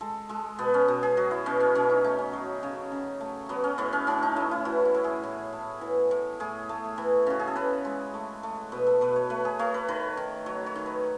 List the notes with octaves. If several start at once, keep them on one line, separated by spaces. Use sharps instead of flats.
G#3 A4
G#3 A4
B2 B3
C#4
B2
G#4
F#3 F#4
E4
B2 C#4
C#4
B2 C#4
D#4
A3 D#4
C#4
F#3
C#3
C#3
A3
F#3 B3
C#4
A2 B3
C#4
A2 C#4
D#4
A3 E4
E4
E3 F#4
E4
A2
G#4
A2
A3
E3
A2
A2 G#4
A3
E3
C#3 F#4
G#4
A4
C#3 B4
G#3
A3
A3
B2 B4
A4
B2 B4
C#5
A3 B4
G#4
A3 C#5
B4
D#3 B4
D#3
F#3 C#5
C#5
D#3
B4